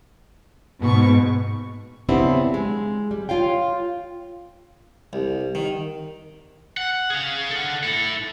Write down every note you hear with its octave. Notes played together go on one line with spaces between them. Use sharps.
G#2 B2 C#6
C#3 B3 C4 D4 E4 G4
G#3
G3
F4 C#5 F5 G5
C2
D#3
F#5
G#4 F5
A4 F#5
E4 A4